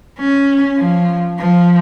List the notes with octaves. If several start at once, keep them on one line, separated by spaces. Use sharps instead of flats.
C#4
F3
F3